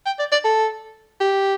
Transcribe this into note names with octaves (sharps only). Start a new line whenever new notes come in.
G5
D5
D5
A4
G4